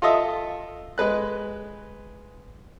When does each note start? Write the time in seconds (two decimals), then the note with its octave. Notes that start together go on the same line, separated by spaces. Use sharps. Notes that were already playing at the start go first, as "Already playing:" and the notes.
0.02 F4 A4 D#5 E5 D#6
0.98 G#3 B4 F#6